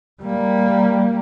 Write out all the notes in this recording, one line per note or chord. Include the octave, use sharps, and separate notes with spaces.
G3 A#3